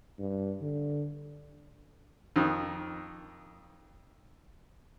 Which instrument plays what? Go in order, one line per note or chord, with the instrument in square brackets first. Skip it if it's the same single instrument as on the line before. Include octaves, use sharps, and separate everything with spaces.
[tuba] G2
D3
[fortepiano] F2 D#3